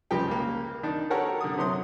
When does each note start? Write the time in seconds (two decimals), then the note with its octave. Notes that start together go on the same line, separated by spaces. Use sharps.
0.11 C#2 F3 G3 G4 G5
0.28 C#2 A#3
0.83 D#3 D4
1.10 F#4 G4 A4 A#4 C#5 F#5
1.41 D3 D#6
1.57 C3 F#3 C6 D#6